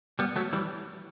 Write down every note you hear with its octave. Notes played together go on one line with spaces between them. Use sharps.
G3 B3
F#3 A3
E3 G3